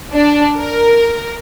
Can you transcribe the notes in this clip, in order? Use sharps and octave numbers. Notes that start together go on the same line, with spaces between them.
D4
A#4